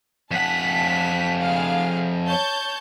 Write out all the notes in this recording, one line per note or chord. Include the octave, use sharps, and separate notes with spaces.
F2 F#5 A5 B6
G#4 F5
C#5 A5 G6